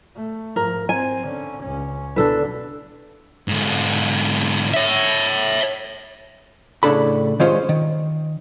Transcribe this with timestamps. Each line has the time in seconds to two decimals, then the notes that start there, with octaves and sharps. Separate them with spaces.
0.16 A3
0.56 G#2 F3 A#4
0.89 C4 G#5
1.23 D3 C#4
1.63 C#2 C#4
2.16 B2 D3 D4 A4 B4
3.48 G#2 D3
4.74 C#5 E5
6.83 A2 C#3 D4 A4 B5
7.40 D#3 G3 G#3 C#4 F4 C5
7.69 D#3